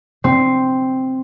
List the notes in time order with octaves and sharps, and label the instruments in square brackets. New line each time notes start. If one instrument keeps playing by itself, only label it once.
[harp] C4